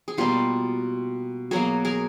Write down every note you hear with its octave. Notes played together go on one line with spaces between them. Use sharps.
G#4
B2 G3 A#3 F4 G4
B2 F#3 A#3 F#4 G#4
G#4 A#4